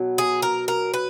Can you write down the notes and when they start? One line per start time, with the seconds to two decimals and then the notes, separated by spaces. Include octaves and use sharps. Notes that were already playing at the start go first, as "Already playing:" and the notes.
Already playing: B2 F#3
0.18 G#4
0.42 A#4
0.68 A#4
0.94 B4